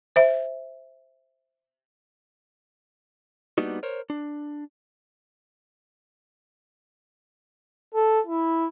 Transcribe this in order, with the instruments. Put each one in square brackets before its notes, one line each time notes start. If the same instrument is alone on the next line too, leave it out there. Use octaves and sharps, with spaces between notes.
[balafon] C5 E5
[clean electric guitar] G3 A#3 B3 D4 D#4 F#4
A#4 C5 C#5
D4
[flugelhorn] A4
E4